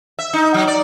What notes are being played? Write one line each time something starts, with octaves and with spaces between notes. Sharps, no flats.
E5
D#4
F#3
D5